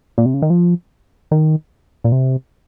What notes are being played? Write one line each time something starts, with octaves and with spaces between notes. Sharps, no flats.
A#2
C3
C#3
D#3
F3
D#3
A#2
C3